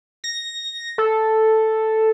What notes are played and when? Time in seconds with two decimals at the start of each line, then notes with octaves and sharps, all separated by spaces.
0.24 A#6
0.98 A4